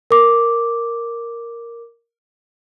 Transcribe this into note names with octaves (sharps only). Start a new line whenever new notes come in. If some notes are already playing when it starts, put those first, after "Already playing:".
A#4 D6